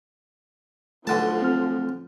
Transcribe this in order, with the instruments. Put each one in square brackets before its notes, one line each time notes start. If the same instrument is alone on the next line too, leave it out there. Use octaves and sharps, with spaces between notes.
[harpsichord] B1 D3 A5 [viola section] F3 [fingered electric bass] A3
[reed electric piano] C4 F6